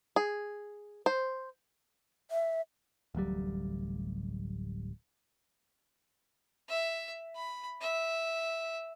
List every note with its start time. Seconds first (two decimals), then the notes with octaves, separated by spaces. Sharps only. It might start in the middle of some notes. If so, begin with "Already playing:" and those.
0.16 G#4
1.06 C5
2.31 E5
3.15 D1 A1 F#3 G3
6.69 E5
7.35 B5
7.81 E5